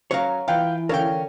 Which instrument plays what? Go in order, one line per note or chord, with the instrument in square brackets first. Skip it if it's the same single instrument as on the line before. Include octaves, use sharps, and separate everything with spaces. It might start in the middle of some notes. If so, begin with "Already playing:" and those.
[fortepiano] F#3 C#4 [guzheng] A#4 F#5 [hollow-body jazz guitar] C#5 F5
[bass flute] E3 [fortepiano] F4 B4 G5 [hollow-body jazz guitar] F5
[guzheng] D3 [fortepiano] C#4 [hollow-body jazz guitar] A#4 F5 G5